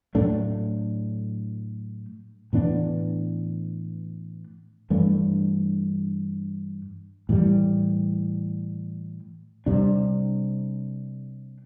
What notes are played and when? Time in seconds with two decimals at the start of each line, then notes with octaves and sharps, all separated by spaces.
0.15 A2 F#3 A3 D4
2.53 A2 E3 B3 D4
4.90 G2 E3 A3 D4
7.29 A2 E3 G3
9.66 C3 G3 D4